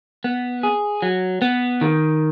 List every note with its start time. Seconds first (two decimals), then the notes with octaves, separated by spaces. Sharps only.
0.24 B3
0.63 G#4
1.02 F#3
1.42 B3
1.81 D#3